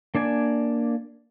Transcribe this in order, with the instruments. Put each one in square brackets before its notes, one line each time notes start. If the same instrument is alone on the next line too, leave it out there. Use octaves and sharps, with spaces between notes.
[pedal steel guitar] A#3 D4 D5 G#5